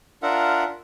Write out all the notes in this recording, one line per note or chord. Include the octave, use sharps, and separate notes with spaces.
D4 F4 A#4 E5 F#5